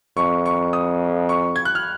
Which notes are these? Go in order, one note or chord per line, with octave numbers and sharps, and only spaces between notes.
F2 C#6
C#6
D#6
C#6
G#6
F#6
F6